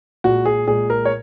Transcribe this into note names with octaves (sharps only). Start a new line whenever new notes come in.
A#2 G#3 F#4
G#4
A#2 G#3 G#4
A#4
C#5